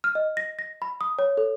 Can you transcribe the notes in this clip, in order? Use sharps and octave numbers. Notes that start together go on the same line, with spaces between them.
F6
D#5
A#6
A#6
B5
D#6
C#5
A4